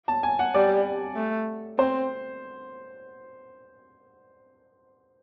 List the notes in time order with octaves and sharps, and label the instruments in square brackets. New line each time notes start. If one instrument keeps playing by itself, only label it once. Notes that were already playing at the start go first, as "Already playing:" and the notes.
[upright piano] A5
G#5
F#5
[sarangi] G3 [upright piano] D5
[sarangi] A3
[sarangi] C4 [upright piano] C5